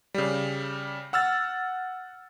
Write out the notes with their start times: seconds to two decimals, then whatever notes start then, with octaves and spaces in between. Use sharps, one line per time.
0.14 C#3 G3
1.13 F#5 E6 F6 A6